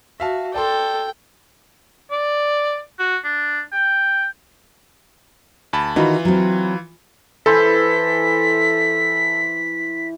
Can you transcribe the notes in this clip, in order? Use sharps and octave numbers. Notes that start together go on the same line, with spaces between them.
F#4 E5 F5 A5
A4 D5 G5 A5 C6
D5
F#4
D4
G5
D2 A5 B5
D#3 E3 D#4 F4 F#4 B5
F#3 C4
E3 E4 A4 C5 B6